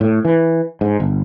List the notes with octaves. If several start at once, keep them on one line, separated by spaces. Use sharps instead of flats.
A2
E3
G#2
G1